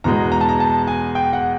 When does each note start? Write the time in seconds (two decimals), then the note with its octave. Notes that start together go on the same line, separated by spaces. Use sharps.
0.04 E2 B2 G#3 A#5
0.32 A#5
0.41 A5
0.49 A#5
0.60 A5
0.87 G#5
1.15 G5
1.33 F#5